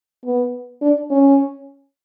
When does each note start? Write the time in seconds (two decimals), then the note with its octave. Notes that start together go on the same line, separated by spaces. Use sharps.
0.25 B3
0.82 D4
1.10 C#4